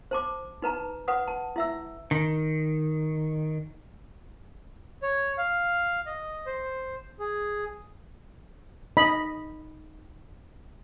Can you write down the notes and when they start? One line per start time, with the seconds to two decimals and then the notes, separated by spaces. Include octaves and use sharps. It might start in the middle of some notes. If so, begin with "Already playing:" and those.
0.11 C5 A5 D6
0.62 D#4 B4 A5 A#5
1.08 B4 F#5 D#6
1.28 A5
1.56 E4 E5 E6
2.11 D#3
5.02 C#5
5.38 F5
6.06 D#5
6.46 C5
7.19 G#4
8.97 D#4 D#5 B5